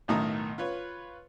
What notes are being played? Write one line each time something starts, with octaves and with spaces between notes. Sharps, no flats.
B1 A2 D#3 A3 A#5 D#6
F4 B4 C#5